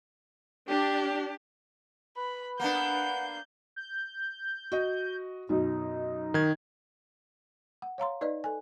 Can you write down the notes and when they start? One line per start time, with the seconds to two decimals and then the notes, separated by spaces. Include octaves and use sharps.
0.69 D4 G4
2.17 B4 B5
2.60 A#3 B3 D4 F#5 G6
3.76 G6
4.72 F#4 D#5
5.49 F#2 B2 D#4
6.34 D#3 G#6
7.82 F#5
7.98 C#5 F5 A#5 C6
8.21 D#4 B4 D5 D#5
8.44 A4 G#5